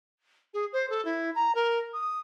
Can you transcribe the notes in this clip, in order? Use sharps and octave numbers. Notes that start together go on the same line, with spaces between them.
G#4
C5
A4
E4
A#5
A#4
D#6